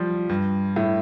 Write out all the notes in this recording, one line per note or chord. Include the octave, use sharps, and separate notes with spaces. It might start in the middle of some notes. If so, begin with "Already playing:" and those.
Already playing: F3 G3
G2
A2